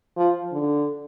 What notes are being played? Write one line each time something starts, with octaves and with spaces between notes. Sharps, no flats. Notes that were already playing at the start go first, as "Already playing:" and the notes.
F3
D3